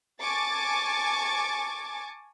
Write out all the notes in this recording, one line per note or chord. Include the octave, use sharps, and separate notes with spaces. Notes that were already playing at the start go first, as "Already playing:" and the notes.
G#5 A5 C#6 D6 A6